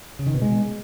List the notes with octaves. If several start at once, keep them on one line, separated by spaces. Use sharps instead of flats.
C#3
D#3
B2
G#3